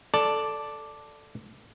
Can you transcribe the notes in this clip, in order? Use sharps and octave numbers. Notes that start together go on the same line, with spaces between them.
A4 D5 A5